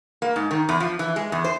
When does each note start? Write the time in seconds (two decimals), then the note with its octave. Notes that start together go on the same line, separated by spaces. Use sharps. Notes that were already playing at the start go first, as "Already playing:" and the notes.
0.22 A#3
0.36 G#2
0.51 D#3
0.69 E2
0.80 F3
0.99 E3
1.16 G#3
1.32 E2
1.44 C5